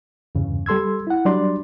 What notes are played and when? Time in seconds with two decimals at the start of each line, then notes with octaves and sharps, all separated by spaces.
0.35 E2 G2 C#3
0.66 G3 A4 C6 E6 G#6
1.07 E4 F#5
1.25 F#3 G3 D4 D5 C6